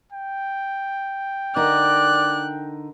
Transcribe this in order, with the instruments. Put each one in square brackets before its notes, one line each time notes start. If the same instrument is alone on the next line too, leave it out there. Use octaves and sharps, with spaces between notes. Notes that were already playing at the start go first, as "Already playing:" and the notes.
[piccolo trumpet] G5
[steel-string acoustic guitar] D3 D#4 A#4 [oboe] D5 [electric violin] F#6